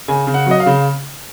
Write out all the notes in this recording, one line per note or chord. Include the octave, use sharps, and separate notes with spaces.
C#3 G#5
C#3
F#5
F#3 D#5
F5
C#3